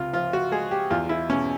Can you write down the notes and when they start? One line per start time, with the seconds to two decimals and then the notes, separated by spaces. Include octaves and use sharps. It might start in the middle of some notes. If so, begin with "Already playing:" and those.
Already playing: C#2 C3 F4
0.13 F3 F4
0.33 F#4
0.52 G#3 G#4
0.71 G4
0.90 E2 F4
1.09 E4
1.29 B2 C#4